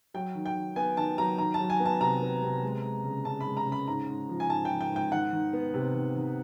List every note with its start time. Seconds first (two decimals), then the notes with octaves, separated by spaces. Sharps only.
0.14 F#3 G5
0.35 D#3
0.46 G5
0.56 D#3
0.76 B3 G#5
0.97 D#3 A5
1.18 F#3 A#5
1.38 D#3 A#5
1.54 A5
1.60 F#3
1.70 G#5
1.80 B3
1.85 A5
2.01 C3 A#5
2.21 B3
2.42 C3
2.63 G#3
2.83 G#3
3.04 C#3
3.25 C#3 A5
3.40 B5
3.46 G#3
3.57 A#5
3.67 C#3
3.72 B5
3.87 G#2 A#5
4.08 G#2
4.29 F3
4.40 G#5
4.50 G#2 A5
4.65 G5
4.70 F3
4.81 G5
4.91 G#2 G5
5.12 D#3 F#5
5.33 D#3
5.53 B3
5.74 C3
5.94 D#3
6.15 D#3